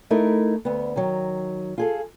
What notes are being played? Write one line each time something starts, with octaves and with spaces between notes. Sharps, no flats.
A3 D#4 E4 A#4
D2 B3
D#3 F#3
F4 G#4 A4